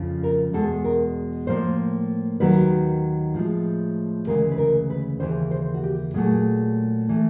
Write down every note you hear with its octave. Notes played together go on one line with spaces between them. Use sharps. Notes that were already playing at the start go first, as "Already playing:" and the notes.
Already playing: F2 C#3 F3
A#4
E2 B2 G#3 A4
A#4
A2 F3 A#3 C5
D#2 D#3 F#3 B4
A2 F3 G#3
D2 C#3 E3 G#3 A#4
B4
A#4
B4
D#2 C#3 E3 C5
C5
F#4
G4
A#2 F#3 A3 G#4
E3 A3